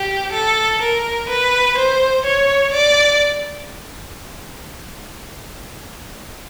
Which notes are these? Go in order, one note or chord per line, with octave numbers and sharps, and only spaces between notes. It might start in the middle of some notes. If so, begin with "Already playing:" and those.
Already playing: G4
A4
A#4
B4
C5
C#5
D5